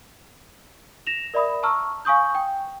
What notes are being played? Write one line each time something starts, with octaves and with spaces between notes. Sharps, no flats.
A#6 E7 F7
A#4 D5 E5 B5 D#6
A5 A#5 C#6 E6 F6
F5 G#5 C#6 D#6 G6
G5